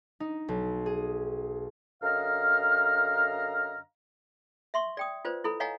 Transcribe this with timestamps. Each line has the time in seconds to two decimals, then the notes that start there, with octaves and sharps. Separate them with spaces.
0.20 D#4
0.48 B1
0.86 G#4
2.02 F#2 D3 D#5 F5 A#5 F6
4.74 E5 C6 C#6
4.97 D5 G5 D#6
5.25 F4 B4 C5 D5
5.44 E4 A4 B5
5.60 C#5 D#5 F5 F#5 G#5 A#5